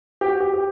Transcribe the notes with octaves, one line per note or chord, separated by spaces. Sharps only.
G4
F#4
G4
G4